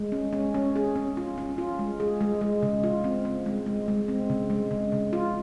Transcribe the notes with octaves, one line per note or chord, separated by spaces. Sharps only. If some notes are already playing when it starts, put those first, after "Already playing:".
Already playing: G#3
C#4
C#4
C#4
G#4
C#4
F4
C#4
F4
G#3
G#4
G#3
G#3
C#3
F4
C4
C4
G#3
G#3
G#3
C4
C#3
G#3
C#3
C#3
F4